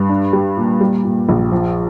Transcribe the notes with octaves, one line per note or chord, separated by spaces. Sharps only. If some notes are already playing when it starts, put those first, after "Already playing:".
Already playing: G2
D4
G3
A#2
G3
A#2
A#1
F3